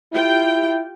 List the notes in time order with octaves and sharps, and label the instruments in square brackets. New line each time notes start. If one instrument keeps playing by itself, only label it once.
[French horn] E4 [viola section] F4 G4 G5